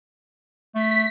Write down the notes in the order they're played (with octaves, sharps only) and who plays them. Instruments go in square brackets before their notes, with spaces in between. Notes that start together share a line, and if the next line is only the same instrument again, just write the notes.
[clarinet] A3 [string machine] B6